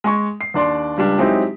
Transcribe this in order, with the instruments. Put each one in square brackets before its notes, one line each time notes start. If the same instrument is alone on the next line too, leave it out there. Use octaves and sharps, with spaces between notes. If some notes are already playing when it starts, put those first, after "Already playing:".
[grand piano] G#3 G#5 C#6
C7
D#2 D4 D5 C6
C#2 G3 D4
F#3 G#3 C4 D#4 E4 G4